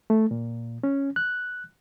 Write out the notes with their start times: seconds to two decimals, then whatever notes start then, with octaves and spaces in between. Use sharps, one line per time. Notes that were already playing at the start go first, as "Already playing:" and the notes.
0.10 A3
0.31 A#2
0.83 C#4
1.16 F#6